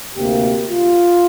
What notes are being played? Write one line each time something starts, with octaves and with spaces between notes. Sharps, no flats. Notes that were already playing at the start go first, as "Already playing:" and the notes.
D2 C3 A#3 G4
F4